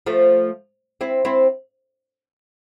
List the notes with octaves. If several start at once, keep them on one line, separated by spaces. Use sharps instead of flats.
F3 A3
C4 E4
C4 E4